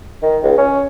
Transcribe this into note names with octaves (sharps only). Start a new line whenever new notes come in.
D#3
C#2
C#4